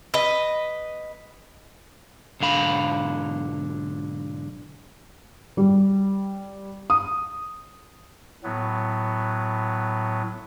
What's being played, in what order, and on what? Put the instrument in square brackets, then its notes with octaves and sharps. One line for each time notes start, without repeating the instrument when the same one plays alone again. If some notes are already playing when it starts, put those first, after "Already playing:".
[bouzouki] B4 D#5
[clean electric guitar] B1 G#2 D3 F5 B5
[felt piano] G3
D#6
[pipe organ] A2 F#3 B3